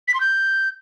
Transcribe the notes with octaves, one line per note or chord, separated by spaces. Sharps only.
B6
C6
G6